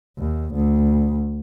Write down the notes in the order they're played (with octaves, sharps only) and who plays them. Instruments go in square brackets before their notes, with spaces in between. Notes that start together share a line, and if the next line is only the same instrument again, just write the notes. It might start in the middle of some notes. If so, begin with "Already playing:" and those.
[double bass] D#2
D2